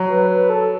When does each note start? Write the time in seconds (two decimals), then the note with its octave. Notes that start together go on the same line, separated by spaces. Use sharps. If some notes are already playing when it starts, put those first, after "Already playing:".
Already playing: F#3
0.09 B4
0.30 B4
0.50 A4